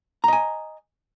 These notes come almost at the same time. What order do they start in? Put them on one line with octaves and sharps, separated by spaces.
A#5 D#5 G#5